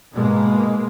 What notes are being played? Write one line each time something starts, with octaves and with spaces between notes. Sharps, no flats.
G#2 B2 G#3 A#3